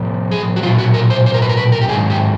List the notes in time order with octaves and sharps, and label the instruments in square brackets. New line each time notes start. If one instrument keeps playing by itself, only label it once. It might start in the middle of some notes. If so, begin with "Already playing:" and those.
Already playing: [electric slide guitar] A2 F3
G#4
F#4
F#3 F4
A#2
F#4
A#4
C5
C5
A#4
B4
A#4
B4
A#4
G4
G#2 D#3 F#3 G#4
G4